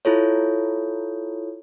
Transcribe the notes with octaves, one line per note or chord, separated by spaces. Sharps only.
E4 F4 A4 C#5